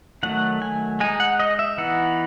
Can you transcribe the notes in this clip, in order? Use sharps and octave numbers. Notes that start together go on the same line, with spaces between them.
D#3 F#3 A3 F#5
G#5
G#3 D#4 G#5
F#5
D#5
E5
E3 B3 D#4 F#5